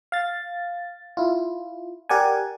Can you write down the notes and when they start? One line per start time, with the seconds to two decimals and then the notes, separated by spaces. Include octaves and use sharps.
0.12 F5 A6
1.17 E4 F4
2.09 G4 A#4 D5 F#5 G#5